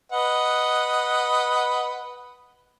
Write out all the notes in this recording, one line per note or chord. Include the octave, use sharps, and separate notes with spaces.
B4 D#5 F#5